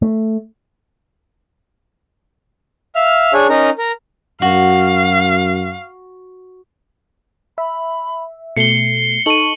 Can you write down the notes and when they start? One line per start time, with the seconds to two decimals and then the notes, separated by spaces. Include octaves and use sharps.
0.02 A3
2.95 E5 F5 F6
3.33 D4 G#4 C#5
3.49 C#4 D#4 A#4
3.78 A#4
4.42 F#2 F#4 F5
7.58 E5 B5
8.57 B2 A3 C7 C#7 G7
9.26 D#4 A4 C#6 D#7 F#7